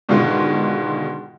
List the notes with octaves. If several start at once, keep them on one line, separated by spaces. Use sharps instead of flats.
G#2 B2 D3 D#3 G#3 F4